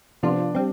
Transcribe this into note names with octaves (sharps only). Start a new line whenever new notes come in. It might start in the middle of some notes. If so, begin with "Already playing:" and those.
C3 F3 B3 D4 F4
G3 C4